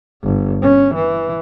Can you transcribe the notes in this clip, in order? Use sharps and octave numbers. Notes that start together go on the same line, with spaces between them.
G1
C#4
E3